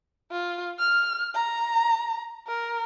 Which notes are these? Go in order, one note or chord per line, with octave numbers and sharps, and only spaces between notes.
F4
F6
A#5
A#4